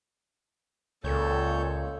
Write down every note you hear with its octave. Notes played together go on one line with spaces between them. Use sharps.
C#2 A#2 A4 C#5 G6